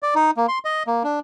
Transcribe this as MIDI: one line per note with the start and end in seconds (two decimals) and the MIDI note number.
0.03 0.14 74
0.15 0.31 63
0.37 0.46 58
0.48 0.59 84
0.65 0.83 75
0.87 1.03 58
1.04 1.19 62